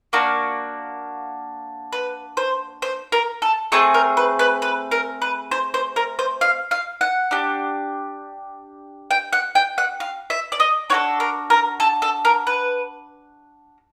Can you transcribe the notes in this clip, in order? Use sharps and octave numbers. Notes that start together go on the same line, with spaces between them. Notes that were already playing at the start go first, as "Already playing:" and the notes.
A#3 D4 F#4
B4
C5
C5
A#4
A4
A3 C4 G#4 A4
A#4
B4
B4
B4
A#4
B4
C5
C5
A#4
C5
F5
F5
F#5
D4 G4
G5
F#5
G5
F#5
F5
E5
D5
D#5
D4 F#4 A4 C#5
A#4
A#4
A4
A4
A#4
B4